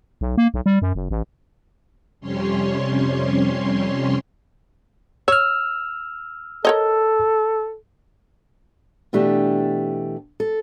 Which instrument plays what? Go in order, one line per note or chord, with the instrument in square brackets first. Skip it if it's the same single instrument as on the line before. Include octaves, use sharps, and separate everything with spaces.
[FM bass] B1
A#3
B1
G3
F#2
F#1
A1
[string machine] F2 C3 G3 C#4 C#5 C6
[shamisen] C#5 [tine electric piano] E6 F6
[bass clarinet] A4 [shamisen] A#4 C#5 D#5
[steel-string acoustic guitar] B2 E3 A3 D4 G4
A4